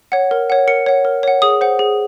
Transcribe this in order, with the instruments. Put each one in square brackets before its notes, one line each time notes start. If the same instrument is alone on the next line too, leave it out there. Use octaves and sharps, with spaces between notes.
[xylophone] C#5 F#5
A#4
C#5 F#5
A#4 C#7
C#5 F#5
A#4
C#5 F#5
G#4 D#6
C5 F#5
G#4